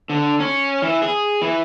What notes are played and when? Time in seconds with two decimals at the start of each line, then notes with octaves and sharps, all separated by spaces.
0.10 D3
0.40 C#4
0.82 E3
1.02 G#4
1.42 E3